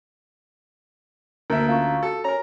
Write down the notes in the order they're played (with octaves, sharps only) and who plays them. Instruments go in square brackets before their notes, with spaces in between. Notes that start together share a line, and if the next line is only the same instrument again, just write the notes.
[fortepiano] D2 E5 [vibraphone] A#3 [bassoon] A#4
[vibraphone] C#4 A#5 C#6 [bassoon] F4
[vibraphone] F#4 [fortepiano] A4
[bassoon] C#4 [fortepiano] A#4 A#5